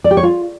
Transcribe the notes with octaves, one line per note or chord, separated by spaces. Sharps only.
D5
G4
C#5
F4